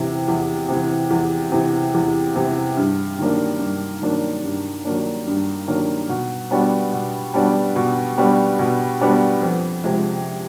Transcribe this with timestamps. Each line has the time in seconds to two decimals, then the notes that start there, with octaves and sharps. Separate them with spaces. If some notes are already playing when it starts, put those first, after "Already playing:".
Already playing: E2 C3 E3
0.28 E2
0.68 C3 E3
1.11 E2
1.52 C3 E3
1.94 E2
2.35 C3 E3
2.77 G2
3.18 D#3 F#3 A#3 D4
3.60 G2
4.01 D#3 F#3 A#3 D4
4.44 G2
4.85 D#3 F#3 A#3 D4
5.27 G2
5.68 D#3 F#3 A#3 D4
6.09 B2
6.51 G3 B3 D4 F#4
6.92 B2
7.34 G3 B3 D4 F#4
7.76 B2
8.18 G3 B3 D4 F#4
8.59 B2
9.01 G3 B3 D4 F#4
9.42 F2
9.84 C3 F3 G#3